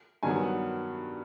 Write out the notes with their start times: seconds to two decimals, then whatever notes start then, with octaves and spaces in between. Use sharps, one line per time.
0.23 G2 D#3 F#3 B3 G#5
0.43 F#5